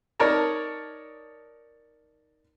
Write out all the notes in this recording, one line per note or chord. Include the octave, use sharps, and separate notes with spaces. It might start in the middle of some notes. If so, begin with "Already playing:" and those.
D#4 A#4 C#5 D5 A5 A#5